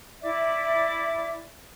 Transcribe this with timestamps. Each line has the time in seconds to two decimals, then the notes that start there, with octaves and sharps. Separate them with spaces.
0.22 E4 D5 E5 D6